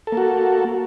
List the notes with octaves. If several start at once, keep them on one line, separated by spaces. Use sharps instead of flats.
A#3 F#4 A4